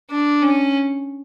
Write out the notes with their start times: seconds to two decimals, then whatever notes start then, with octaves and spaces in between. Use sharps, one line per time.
0.10 D4
0.42 C#4